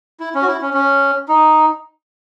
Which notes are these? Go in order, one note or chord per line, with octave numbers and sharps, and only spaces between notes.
E4
C#4
F#4
E4
C#4
C#4
D#4